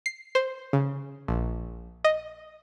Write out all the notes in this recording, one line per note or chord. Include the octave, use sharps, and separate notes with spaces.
C7
C5
C#3
A#1
D#5